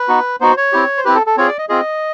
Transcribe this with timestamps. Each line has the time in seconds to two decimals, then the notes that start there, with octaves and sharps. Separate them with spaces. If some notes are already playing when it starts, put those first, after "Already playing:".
Already playing: B4
0.08 B3 D#4 F#4
0.41 B3 D#4 F#4 C5
0.57 C#5
0.73 C4 E4 G4
0.97 C5
1.05 C4 E4 G4 B4
1.15 A4
1.27 A4
1.37 C4 F4 G#4 C#5
1.48 D5
1.58 D#5
1.69 C4 F4 G#4 D#5